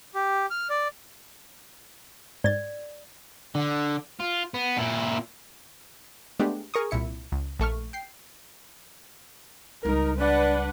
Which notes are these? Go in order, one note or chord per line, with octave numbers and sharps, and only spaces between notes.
G4
F6
D5
G#2 D5 A6
D3
F4
B3
A#2 E4
G#3 A3 B3 D4 G4
G#4 A#4 C#6 D#6
C2 A#2 E4 C#7
C#2
A#1 A3 C#6 F6
G5 C7
C#2 G3 D#4 A#4
D4 B4 D5 F#5